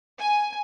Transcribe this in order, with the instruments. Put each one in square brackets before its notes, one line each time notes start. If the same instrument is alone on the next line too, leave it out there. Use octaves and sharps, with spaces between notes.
[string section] G#5